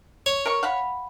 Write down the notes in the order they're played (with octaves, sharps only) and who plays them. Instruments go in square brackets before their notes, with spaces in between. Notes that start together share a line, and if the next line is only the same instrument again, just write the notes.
[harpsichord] C#5
[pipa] A#4 C#6
F5 F#5 B5